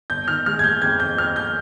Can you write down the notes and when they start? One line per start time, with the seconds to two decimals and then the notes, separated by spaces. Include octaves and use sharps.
0.10 G1 G6
0.28 D#3 F6
0.46 G#3 F6
0.59 G#6
0.64 G#3 G6
0.82 F2 G#6
1.00 F2 G6
1.18 F2 F6
1.36 G6